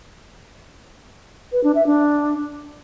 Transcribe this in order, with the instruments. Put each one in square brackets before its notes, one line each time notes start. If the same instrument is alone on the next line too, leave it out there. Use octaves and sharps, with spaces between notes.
[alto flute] B4
D4
E5
D4